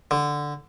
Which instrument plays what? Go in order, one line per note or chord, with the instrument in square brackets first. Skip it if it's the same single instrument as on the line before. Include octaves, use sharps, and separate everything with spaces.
[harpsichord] D3